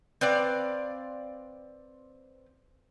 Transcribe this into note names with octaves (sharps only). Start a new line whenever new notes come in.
C4 B4 D5 F5